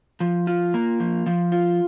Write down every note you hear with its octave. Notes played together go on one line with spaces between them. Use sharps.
F3
F4
A#3
F3
F3
F4